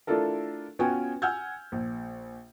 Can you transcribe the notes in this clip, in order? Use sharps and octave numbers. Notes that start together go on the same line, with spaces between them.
A3 D4 E4 F4 A4 A#4
B3 C#4 F4 F#4 G5 G#5
F#5 G#5 E6 F6 G6 G#6
A#1